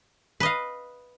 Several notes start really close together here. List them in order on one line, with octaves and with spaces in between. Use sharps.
B4 D#5 F5